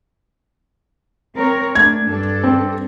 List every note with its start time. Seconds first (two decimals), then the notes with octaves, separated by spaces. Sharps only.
1.34 C4 A#4 C#5
1.75 A3 D4 G#6
2.08 G2 D4 A4
2.44 C4